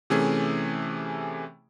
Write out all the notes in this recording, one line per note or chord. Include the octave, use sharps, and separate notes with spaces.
C3 E3 A3 C#4 G#4